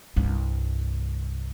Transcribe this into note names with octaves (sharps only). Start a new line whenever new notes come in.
C2 G2